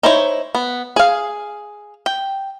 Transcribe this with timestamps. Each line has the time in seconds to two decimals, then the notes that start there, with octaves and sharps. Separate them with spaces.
0.03 D#4 E4 C5 C#5
0.55 B3
0.96 G#4 F5
2.06 G5